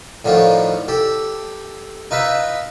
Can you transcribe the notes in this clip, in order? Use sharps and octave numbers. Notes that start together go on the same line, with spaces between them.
A2 D3 D#3 F3 F4
G4 A4
D#4 F4 B4 E5